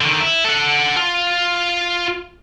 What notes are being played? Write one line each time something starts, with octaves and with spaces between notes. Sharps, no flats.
D3 D#3
E4
A4 F#5
F4